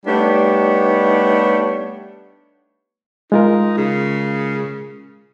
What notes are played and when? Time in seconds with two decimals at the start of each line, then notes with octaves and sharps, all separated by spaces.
0.06 G3 A3 B3 D4 D#4 C#5
3.32 G#3 D#4 F4 A#4
3.78 C#3